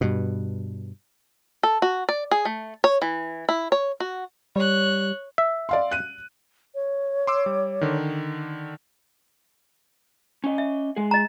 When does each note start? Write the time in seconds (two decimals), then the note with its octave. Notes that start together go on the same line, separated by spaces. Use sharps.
0.01 G2 B2
1.63 A4
1.82 F#4
2.09 D5
2.31 G#4
2.45 A3
2.84 C#5
3.02 E3
3.49 E4
3.72 C#5
4.00 F#4
4.56 G3 C#5 F#6
5.38 E5
5.69 D5 F5 C6
5.91 F#6 D#7
6.75 C#5
7.27 C6 D6 E6
7.46 G3
7.81 D3 D#3
10.44 C#4 D#5
10.58 E5
10.96 G#3 G#4
11.11 D#5 A#5